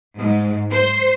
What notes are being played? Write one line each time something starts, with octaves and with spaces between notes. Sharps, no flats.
G#2
C5